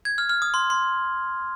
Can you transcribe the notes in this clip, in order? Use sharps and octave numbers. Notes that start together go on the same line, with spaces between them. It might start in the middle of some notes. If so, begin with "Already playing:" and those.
G#6
F6
F6
D#6
C6
C6